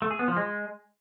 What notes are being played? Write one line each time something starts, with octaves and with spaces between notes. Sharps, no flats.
A3
G#4
B3
F3
G#3